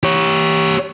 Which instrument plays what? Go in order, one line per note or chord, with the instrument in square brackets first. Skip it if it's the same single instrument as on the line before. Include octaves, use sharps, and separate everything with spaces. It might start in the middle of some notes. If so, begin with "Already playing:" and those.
[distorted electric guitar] G4 C#5